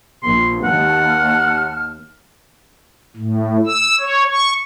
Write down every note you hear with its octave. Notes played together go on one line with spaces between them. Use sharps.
A#1 C6
D#2 F#5 A5 F6
A2
E6
C#5
C#6